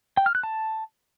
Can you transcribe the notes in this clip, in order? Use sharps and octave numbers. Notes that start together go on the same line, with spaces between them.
G5
F6
F#6
A5